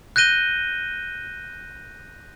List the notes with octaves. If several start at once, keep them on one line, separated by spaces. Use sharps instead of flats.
F#6 G6 A#6 D#7 G7